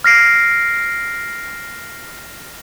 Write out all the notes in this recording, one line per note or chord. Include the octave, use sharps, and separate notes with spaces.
F6 A#6 C7 D7